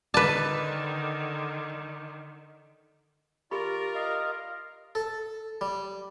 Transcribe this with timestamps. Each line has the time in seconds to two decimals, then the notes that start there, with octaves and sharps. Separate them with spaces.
0.14 D3 D#3 B4 D5 A5
3.51 F4 G4 A#4 D5 B5
3.95 D#5 F5
4.95 A4
5.61 G3